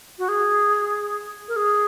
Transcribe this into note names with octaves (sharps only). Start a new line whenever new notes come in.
F#4
G#4
A#4
G#4